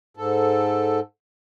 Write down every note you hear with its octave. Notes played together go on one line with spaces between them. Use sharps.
G#2 A4